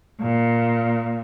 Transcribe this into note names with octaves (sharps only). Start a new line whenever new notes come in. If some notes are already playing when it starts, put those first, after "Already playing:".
A#2